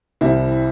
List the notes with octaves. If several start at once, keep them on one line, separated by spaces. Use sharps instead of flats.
C2 C3 G3 E4